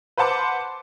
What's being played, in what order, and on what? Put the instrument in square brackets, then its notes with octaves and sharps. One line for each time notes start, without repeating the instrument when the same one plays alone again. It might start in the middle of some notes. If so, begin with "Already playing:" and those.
[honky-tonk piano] B4 C5 F#5 A5 C6 D6